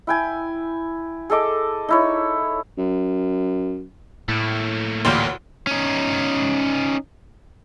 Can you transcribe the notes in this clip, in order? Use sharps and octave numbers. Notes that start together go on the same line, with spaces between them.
E4 G5 G#5
G#4 A4 D#5 D6
D#4 E4 C#5
F#2
A2 A3 A#3
A1 D2 A#2 G3 A#3 G4 F5 C6
C#4 D#4